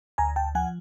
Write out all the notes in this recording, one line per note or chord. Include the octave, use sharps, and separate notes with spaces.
D2 G#5 A#5
G5 A5
F3 F#5 G#5